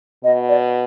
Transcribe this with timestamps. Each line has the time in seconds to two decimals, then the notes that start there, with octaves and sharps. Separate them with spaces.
0.24 B2 D#5
0.49 D5